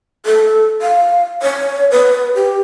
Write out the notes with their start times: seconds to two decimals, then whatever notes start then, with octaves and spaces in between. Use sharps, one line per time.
0.26 A4
0.82 F5
1.42 C#5
1.91 B4
2.35 G4